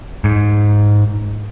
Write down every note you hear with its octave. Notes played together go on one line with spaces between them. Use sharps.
G#2